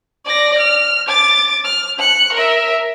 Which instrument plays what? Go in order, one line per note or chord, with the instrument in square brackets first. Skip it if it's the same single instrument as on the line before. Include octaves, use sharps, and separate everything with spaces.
[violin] D5 A#6
F6
D6 A6
F6
F#6 C#7
A#4 E5